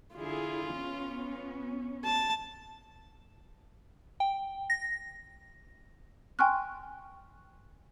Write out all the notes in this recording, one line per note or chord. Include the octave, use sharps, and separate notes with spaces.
D3 E4 F4 G#4
B3 C#4
A5
G5
A#6
G5 G#5 C6 C#6 F6 F#6